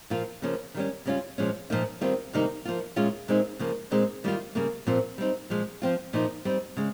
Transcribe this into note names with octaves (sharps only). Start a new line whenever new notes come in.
A#2 F3 A#3 F4
C#3 F3 A#3 C#4
D#3 G3 C#4
C#3 G3 C#4 F4
A#2 F3 G#3 C#4
A#2 F3 A#3 D#4
D#3 G3 C4 F4
C3 D#3 G3 A#3 D#4
F3 A#3 F4
A#2 G#3 C#4 F4
A#2 G#3 C4 D#4
C#3 F3 A#3
A#2 G#3 C4 D#4
D#3 G3 A#3 F4
C#3 G3 A#3
A#2 F3 C4 F4
G3 C4 D#4
A#2 F3 G#3
F3 C4 F4
A#2 F3 A#3 D#4
G3 C4 D#4
C#3 G#3